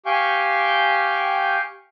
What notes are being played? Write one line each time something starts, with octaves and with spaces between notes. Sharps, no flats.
G4 F5 G5 G#5 C#6 G6